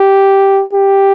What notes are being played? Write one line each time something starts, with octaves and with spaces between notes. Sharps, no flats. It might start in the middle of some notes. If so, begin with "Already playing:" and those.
Already playing: G4
G4